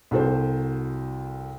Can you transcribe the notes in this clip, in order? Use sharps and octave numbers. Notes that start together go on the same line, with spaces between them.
C2 F#4 A4 C5